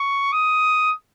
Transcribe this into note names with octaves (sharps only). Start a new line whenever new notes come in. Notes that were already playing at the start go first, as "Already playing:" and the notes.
Already playing: C#6
D#6